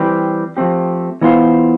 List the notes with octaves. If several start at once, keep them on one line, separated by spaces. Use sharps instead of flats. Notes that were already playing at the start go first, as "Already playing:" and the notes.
Already playing: E3 G3 C4 G4 B4
F3 A3 C4 G4
E3 B3 F4 C5